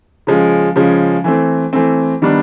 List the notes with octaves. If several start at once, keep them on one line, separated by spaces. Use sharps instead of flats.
C#3 F3 G#3
C#3 F3 G#3
E3 A3 C4
E3 A3 C4
D#3 G3 B3 D4